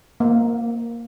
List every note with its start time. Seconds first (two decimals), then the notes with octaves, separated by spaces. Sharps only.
0.20 A#3